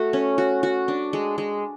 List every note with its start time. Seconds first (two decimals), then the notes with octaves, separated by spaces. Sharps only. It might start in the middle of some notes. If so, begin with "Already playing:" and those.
Already playing: A3 F#4
0.13 C#4
0.38 F#4
0.63 F#4
0.88 D4
1.13 G#3
1.38 G#3